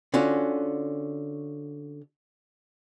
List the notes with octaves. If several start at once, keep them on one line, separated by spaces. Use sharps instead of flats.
D3 C#4 F4 F#4